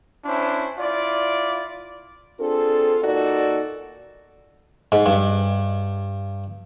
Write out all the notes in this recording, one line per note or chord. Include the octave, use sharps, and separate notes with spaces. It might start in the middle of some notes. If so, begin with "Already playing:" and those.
C#4 D4 E4 C5
E4 F4 D5
C4 D4 F4 G#4 A4
A#2 D#4 F#4 A4 D5
G#2
G2